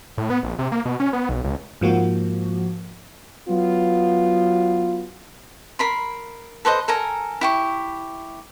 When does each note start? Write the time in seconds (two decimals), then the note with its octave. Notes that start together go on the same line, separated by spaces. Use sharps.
0.18 A2
0.30 B3
0.43 A#1
0.59 C3
0.72 A#3
0.85 B2
1.00 C#4
1.13 B3
1.29 B1
1.44 C#2
1.81 G#2 F3 A#3 F#4
3.48 F#3 B3 F4
5.79 A#4 B5 C6
6.65 A4 B4 C5 D#5
6.88 A4 A#4 G#5 A#5
7.41 E4 G4 C#6